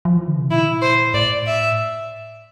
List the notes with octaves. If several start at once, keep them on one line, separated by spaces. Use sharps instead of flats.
F3
E3
D3
C3
A#2 E4
C5
A2 D5
E5